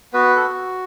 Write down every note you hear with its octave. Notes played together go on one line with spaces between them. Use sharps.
B3 F#4 B4
A4